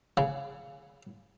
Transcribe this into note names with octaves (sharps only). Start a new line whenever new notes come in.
C#3